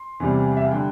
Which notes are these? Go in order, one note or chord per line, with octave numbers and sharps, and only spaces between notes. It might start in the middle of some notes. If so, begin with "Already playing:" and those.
Already playing: C6
E2 C3 G3
E5
F5
D3 G3 G5